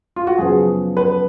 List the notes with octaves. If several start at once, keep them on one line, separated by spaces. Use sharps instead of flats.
F4
F#4
F#2 C#3 F3 B3 G#4
B4